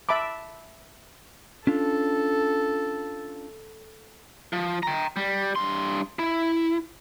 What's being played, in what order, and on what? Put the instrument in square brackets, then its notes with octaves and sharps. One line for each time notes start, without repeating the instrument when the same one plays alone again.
[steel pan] E5 A5 B5 D6
[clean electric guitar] C#4 D4 F4 [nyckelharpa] A4
[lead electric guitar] F3
G5 A#5
G3
G2 C6
E4